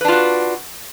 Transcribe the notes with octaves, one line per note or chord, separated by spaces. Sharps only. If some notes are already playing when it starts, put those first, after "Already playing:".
D4 F4 F#4 B4